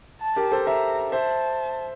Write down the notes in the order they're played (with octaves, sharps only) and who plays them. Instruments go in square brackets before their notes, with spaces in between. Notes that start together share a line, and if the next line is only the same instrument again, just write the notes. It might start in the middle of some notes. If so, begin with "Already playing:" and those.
[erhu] A5
[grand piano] G4 A#4
A4 C5
[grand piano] C5 E5 [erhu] A#5
[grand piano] C5 E5 [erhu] A5